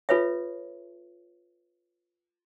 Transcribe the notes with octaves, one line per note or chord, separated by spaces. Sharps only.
F4 A4 B4 C#5 E5